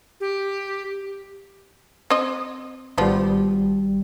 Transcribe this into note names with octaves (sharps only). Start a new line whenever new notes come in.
G4
C4 D#5
G#1 F3 G3 B3 C5